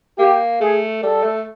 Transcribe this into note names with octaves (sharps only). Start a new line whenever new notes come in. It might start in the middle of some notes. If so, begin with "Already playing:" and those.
A#3 G4
A3 G#4
G3 A4
A3